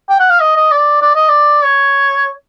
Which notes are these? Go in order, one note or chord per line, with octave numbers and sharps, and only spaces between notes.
G5
F#5
F5
D#5
D#5
D5
D5
D#5
D5
C#5